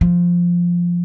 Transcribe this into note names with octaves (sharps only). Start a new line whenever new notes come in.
F3